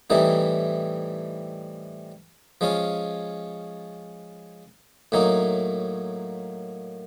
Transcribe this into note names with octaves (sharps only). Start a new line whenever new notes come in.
A2 E3 G3 C4 D#4
F3 G#3 C#4 F4
A2 F#3 A#3 D#4